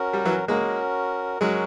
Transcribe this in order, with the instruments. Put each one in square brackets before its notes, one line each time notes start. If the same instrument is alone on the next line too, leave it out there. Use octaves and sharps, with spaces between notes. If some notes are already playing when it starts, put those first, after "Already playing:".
Already playing: [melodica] C#4 F#4 A#4
[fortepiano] G3
E3 F#3
[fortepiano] G#3 A#3 [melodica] C#4 F#4 A#4
[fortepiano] F#3 G#3 [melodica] C#4 F#4 A#4